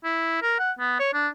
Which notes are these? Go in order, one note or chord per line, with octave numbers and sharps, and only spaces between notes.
E4
A#4
F#5
B3
C#5
D4